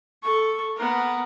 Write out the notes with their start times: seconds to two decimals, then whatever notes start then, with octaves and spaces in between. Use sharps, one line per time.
0.23 A4 C#6
0.77 B3 A#4